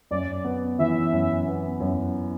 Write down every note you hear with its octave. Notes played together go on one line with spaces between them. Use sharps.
F#2 D5
B3
E3 E5
F#2
B3
F#2